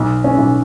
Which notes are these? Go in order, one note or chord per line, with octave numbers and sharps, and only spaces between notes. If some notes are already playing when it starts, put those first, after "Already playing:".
Already playing: B1
C#4
B1